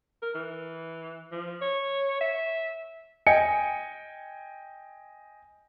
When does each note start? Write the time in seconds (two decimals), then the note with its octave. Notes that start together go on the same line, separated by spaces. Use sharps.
0.22 A#4
0.35 E3
1.32 F3
1.62 C#5
2.21 E5
3.27 D#5 G5 G#5 C#7